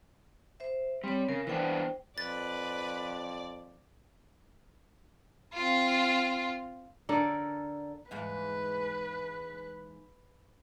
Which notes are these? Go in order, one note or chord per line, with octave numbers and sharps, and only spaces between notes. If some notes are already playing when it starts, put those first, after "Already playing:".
C5 E5
G3 C4 C#5
C#3 A#4
E3 B3 D4 C5 G5
F2 B4 D5 A6
C4 F4
D3 A4 A#4 D5
E2 G#2 B4 F5